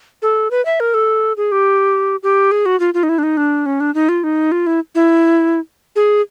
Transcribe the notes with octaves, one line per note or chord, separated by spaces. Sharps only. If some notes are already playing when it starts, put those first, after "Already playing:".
A4
B4
E5
A#4
A4
G#4
G4
G4
G#4
F#4
F4
F4
D#4
E4
D4
D#4
D4
C#4
D4
D#4
F4
D#4
F4
E4
E4
G#4